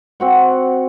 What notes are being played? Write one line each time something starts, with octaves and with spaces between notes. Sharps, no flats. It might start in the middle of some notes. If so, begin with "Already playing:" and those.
C4 F#4 F#5